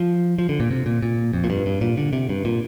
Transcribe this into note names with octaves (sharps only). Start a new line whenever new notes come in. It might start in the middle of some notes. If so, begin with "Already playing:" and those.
Already playing: F3
F3
D3
A#2
C3
A#2
A#2
F2
A#2
G2
G2
A#2
D3
C3
G2
A#2